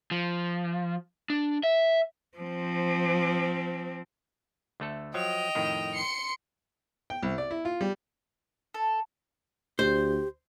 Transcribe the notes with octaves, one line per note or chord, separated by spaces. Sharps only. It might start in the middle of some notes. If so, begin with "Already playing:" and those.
F3
D4
E5
F3 C4
D2 A3 A4
F3 F#3 D#5 G5 F7
F2 A2 D#3
C6 C#7
G5
C2
D5
E4
F4
G3
A4
D2 G4 C5